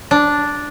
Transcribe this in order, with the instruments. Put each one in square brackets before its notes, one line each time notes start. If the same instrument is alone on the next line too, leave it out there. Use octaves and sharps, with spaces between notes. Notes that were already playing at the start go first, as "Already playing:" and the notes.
[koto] D4